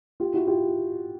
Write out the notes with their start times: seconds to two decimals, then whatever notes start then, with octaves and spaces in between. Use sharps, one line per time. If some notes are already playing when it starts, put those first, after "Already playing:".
0.20 F4 G4
0.34 E4 F#4
0.47 F4 G4